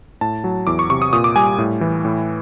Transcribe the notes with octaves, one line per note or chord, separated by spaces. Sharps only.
A2 A5
F#3
E2 D6
C#6
C3 C#6
D#6
A#2 D#6
D6
G3 G#5
A2
E3
A2